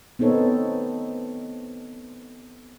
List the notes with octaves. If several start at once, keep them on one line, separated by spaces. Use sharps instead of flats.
B3 C4 D#4 A4 C#5